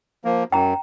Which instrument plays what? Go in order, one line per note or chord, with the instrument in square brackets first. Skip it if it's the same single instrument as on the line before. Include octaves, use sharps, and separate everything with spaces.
[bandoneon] F3 A#3
[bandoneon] F#2 [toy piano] G5 A#5